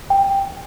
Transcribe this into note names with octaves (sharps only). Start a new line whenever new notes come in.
G5